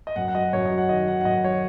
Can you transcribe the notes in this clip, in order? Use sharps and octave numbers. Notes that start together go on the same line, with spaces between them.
D#5
F#2 F#5
F#5
F#3 D#5
F#2 C#5
D#5
F#3
F#5
D#3 D#5
D#3 F#5
F#5
F#2 D#5
F#3 C#5